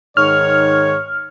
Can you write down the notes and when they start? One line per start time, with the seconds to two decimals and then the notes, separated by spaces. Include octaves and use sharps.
0.17 G#2 D#3 C#5 F6